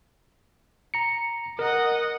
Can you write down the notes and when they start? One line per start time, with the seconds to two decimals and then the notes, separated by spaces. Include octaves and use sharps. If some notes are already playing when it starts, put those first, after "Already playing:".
0.94 A#5 C#7
1.59 A#4 D#5 F#5